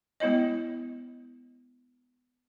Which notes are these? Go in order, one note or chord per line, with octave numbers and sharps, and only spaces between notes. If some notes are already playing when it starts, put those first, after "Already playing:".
G#3 B3 E4 C#5 D#5